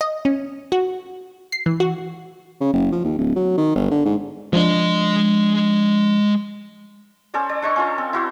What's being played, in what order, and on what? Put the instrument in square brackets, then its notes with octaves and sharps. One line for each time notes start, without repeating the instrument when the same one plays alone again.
[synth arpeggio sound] D#5
C#4
F#4
C7
E3
F#4
[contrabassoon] C#3
F#1
F3
D#2
D1
F#3
D#3
G1
D3
G#2
[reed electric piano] F3 D4 [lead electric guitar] G#3 D#5
[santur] C#4 A4 C5 D5
D5
D4 C5 D#5 C#6
C#4 F4 A4
C4
E4 F#4 C5